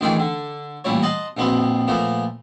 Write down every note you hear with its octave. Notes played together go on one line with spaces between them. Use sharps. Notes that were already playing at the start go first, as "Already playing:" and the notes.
A1 D#3 E3 F4 G#4 G5
D3
A1 A#2 G3 E4 C#5
D#5 F#5 A5 C6
A#1 B2 B3 C4 C6
A#2 F3 A3 B3